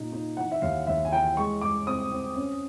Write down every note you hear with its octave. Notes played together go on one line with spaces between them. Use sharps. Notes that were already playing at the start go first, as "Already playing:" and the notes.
Already playing: A#2 A#3 D#4
D#4
E3 F#5
E5
D#2 F5
D#2 E5
G#5
E3 G5
G#3 C#6
G#3 D6
C4 D#6
C4
C#4